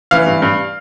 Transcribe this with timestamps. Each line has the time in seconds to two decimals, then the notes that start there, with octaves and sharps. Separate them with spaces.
0.11 E3 F5
0.27 G2
0.42 G2